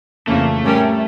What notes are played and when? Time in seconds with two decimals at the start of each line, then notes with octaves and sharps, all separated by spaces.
0.27 F2 C#3 E3 A3 A#3
0.63 A2 G3 C#4 G4 A#4